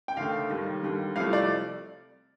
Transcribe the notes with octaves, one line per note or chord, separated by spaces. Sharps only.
G5
D#2 D3 A3 F5
D#2 D#3 G3
D#2 D3 G3
C2 C3 F3 A3 F5
D5